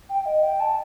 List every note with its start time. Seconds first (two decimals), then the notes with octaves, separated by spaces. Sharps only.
0.09 G5
0.26 D#5
0.43 G5
0.60 A5